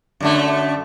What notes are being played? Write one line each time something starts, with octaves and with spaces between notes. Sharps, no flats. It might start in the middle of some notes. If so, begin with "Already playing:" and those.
F#2 D3 A3